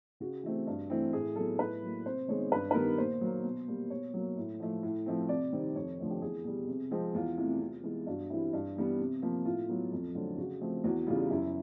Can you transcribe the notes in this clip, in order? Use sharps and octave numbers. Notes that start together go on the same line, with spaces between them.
C#3 F#4
E3 A3 C4
G2
E3 A3 C4
A2 G#4
F#3 B3 A4
A2 B4
F#3 A#3
C3 C5
D#3 G#3 B3 C#5
G2 B4
B4
D#3 G3 B3 A#4
A#2 C5
F#3 A#3
B2
G3 A#3
B2 C#5
F#3 A#3
A2
F3 A3
A2
F3 A3 C4
C3 D5
D#3 G3 C4
F2 C#5
D3 F3 A3 C4
G4
E2 G#4
B2 G3
C3
F3 G#3 C4
E2 F4
C3 E3 A3
C3
E3 G#3 B3
G2 F#4
E3 G3 C4 E4
G2
E3 G3 B3
C3
F3 A#3
A2 F4
F#3 B3
F2
D3 F#3 A3 C4
C#3 F#4
F3 A3 C4
E2 F#4
C#3 E3 G3 F4
F#2 E4